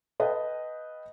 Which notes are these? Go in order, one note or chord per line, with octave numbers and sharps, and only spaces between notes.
B4 D#5 F5 G5 A5